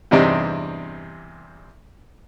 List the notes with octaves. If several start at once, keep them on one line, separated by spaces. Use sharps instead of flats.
E2 G2 C3 C4 D4 D#4